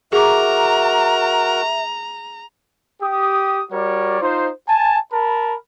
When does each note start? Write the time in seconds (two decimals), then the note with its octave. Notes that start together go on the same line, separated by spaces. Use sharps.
0.13 F#4 G#4 A#4 E5 A#5 D6
3.02 G4 D#6
3.71 G3 F#4 A#4 C#5 D5
4.21 D#4 F4 C5
4.68 G#5 A5
5.12 A#4 A5 B5